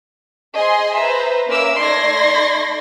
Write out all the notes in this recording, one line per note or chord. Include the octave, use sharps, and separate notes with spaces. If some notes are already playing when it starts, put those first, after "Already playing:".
G#4 C5 D#5 G#5 C6
B4 C5 E5 A#5
A#3 C#4 A#4 E5 D6 E6
A3 D#4 D5 C6 G#6 A#6